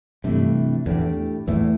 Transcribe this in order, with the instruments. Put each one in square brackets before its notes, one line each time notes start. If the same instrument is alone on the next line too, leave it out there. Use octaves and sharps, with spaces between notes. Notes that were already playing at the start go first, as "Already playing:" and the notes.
[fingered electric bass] G2 [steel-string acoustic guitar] C3 E3 A3 D4
[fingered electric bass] E2 [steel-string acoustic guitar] A2 A3 D4 G4 D5
[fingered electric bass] E2 [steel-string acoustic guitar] A2 A3 E4